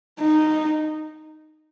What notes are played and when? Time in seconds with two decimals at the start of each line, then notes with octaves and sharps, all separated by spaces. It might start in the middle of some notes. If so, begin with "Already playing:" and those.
0.20 D#4